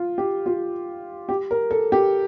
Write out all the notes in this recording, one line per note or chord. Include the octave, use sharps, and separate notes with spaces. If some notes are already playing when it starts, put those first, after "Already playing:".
Already playing: F4
G4
F4
G4
A#4
A4
G4